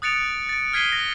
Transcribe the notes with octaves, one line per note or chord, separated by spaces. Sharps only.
D#6 F#6 A6 C#7 D7 F7
A6 D7
F6 G#6 B6 C7 D#7 G7
A#6